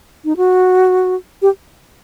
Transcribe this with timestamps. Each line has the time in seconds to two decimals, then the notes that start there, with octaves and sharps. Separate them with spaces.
0.25 D#4
0.37 F#4
1.42 G4